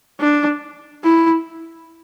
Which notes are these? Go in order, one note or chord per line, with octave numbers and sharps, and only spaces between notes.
D4
E4